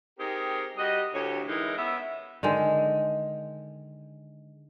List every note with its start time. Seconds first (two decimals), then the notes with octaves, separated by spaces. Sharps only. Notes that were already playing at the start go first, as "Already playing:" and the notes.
0.19 C4 D#4 G4 G#4 A#4
0.77 G3 F#4 D#5
1.14 D2 A2 G4 C#5
1.48 E3 G#3 D#4 E4 A#4
1.77 B3 C#4 E5
2.43 D3 D#3 G#3